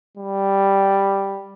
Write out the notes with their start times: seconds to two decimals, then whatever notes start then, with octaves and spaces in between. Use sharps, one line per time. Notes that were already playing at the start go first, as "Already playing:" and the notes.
0.17 G3